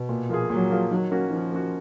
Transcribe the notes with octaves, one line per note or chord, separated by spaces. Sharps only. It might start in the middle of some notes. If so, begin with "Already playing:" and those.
Already playing: B2
A#2
F3 A#3 F4 G#4
A#2 F#3
F3 A#3 F4 G#4
D#3 F#3
A#3 C#4 F#4
D#3 F3
A#3 C#4 F#4